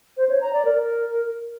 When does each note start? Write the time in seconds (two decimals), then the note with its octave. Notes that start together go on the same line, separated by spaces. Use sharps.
0.17 C5
0.29 C#5
0.41 A#5
0.53 D5
0.65 A#4